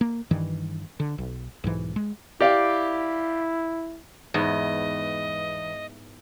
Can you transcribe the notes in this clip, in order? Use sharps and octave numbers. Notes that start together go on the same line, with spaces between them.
A#3
G2 D#3 E3
D3
B1
B1 G#2 E3
G#3
E4 G4 D5 F5
E2 G#2 B3 D#5